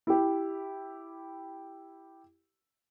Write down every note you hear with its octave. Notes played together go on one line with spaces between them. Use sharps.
E4 G4